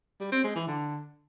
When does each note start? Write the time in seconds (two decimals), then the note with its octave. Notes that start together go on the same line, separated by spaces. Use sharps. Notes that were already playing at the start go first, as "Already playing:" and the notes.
0.20 G3
0.32 C4
0.44 G#3
0.56 E3
0.67 D3